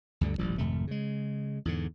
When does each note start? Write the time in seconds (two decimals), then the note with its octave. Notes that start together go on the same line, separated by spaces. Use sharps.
0.21 D2 G2 D3 G3
0.38 D#1 A1 F3 G3
0.58 G#1 F2 C3 A3
0.87 C#3 G#3
1.65 E2 G#2 D3